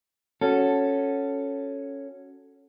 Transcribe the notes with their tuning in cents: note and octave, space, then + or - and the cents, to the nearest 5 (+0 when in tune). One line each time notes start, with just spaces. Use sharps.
C#4 +0 F#4 +0 A4 +0